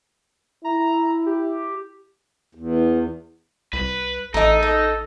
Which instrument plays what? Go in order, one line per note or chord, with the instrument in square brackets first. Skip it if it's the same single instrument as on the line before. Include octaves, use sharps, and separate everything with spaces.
[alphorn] E4 [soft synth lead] A#5
[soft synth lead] G4
[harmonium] E2
[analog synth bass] C2 [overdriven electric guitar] B4
[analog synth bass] A1 [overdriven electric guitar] D#4 [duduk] A4 [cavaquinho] D#5 A#5
[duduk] A4 [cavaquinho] D#5